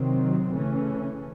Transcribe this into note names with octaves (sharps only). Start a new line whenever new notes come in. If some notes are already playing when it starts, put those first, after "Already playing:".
Already playing: C3 D#3 F#3 C4
C#3 E3 A3 C#4